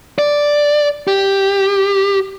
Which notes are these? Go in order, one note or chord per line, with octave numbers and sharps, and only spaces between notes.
D5
G4